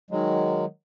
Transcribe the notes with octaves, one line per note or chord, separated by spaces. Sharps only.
D#3 F#3 G#3